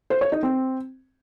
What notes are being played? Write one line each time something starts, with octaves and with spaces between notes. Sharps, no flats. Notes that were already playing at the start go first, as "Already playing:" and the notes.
C5
C#5
D#4
C4